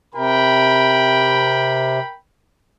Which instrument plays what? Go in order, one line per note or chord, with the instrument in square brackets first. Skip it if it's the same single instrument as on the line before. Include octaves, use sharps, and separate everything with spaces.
[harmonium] C3 [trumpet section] A#4 G5 B5